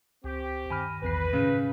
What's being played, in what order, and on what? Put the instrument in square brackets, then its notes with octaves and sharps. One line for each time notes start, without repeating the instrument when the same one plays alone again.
[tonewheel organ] C#2 [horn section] C4 G4
[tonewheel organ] G2 D#3 [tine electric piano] G#5 B5 F6
[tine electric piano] A#1 E2 C7 [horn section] B4
[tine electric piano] A2 [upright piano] C#3